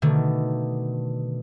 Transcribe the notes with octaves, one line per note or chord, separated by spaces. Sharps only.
B2 D3 D#3 A3